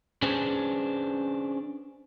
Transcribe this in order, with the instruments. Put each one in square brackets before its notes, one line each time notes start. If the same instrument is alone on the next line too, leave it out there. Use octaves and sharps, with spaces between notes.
[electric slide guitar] C#4 D4 G#4 B4 C5